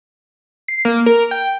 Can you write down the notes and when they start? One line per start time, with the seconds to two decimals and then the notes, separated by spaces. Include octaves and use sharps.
0.68 C7
0.85 A#3
1.06 A#4
1.31 G5